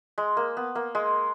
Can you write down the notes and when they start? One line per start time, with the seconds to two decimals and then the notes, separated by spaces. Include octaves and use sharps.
0.18 G#3
0.37 A#3
0.57 B3
0.75 A#3
0.95 G#3